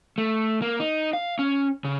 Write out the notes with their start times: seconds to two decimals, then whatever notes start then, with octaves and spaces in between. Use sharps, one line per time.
0.18 A3
0.62 A#3
0.80 D#4
1.13 F5
1.39 C#4
1.84 C#3